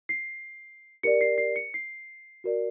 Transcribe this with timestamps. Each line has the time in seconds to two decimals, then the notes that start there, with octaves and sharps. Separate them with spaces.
0.09 C7
1.03 G4 A#4 D5 C#7
1.21 C7
1.38 C7
1.56 C#7
1.74 C7
2.44 F#4 A#4 D5